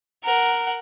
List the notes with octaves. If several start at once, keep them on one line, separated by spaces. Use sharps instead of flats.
A#4 F#5